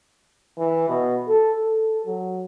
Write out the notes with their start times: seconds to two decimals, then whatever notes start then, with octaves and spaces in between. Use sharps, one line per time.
0.58 E3
0.89 B2
1.28 A4
1.65 A4
2.06 F#3